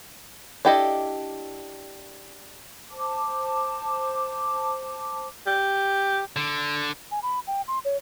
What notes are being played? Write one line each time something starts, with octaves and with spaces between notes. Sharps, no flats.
D4 E4 G4 A4 D#5
C5 A5 D6
G4
D3
G#5
B5
G5
C6
C#5